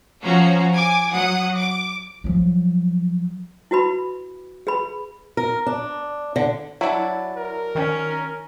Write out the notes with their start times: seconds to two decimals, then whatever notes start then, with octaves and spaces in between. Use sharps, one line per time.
0.23 F3 C#4 F#4 A#5
0.74 G#5 D6
1.11 F#3 F#5 D#6
1.55 D6
2.24 F3 F#3
3.71 E4 F#4 B4 B5
4.67 G#4 B4 B5
5.37 A#4
5.66 D4
6.36 D3
6.81 F#3 D4 E4
7.37 A#4
7.75 D#3 C#4